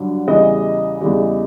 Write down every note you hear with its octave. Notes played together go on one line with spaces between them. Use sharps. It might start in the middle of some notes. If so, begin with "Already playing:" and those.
Already playing: G2 D3 F#3
E2 C#3 E3 G3 D#5
E2 C#3 E3 G3